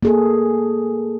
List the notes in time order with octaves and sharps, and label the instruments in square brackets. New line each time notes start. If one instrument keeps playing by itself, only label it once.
[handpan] A#3 G#4 A4